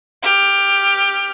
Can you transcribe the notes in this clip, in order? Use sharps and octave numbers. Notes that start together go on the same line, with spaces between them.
G4 F6